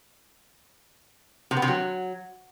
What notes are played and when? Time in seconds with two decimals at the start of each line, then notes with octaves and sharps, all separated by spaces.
1.51 C3
1.57 B3
1.62 C3
1.68 F#3